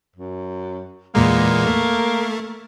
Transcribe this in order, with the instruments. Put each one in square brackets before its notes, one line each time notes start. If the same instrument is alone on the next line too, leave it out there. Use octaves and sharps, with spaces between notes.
[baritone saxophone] F#2
[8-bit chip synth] E2 A#2 G#3 [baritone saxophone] A#3
[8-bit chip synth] A3